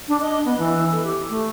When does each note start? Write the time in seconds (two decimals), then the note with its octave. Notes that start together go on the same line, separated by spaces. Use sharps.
0.08 D4
0.21 D#5
0.45 B3
0.58 E3
0.92 A4
1.04 G4
1.29 A3